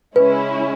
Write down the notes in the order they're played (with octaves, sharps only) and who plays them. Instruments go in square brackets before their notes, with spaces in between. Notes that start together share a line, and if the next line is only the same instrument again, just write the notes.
[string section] C#3 G#3 C#4 E4 [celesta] B4